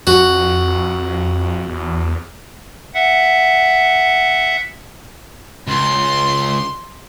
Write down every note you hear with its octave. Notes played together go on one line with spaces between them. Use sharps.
F2 F#4
E2
E5 F#5
C#2 C6